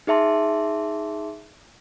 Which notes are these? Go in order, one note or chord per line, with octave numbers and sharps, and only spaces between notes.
D#4 G#4 E5 A5 C6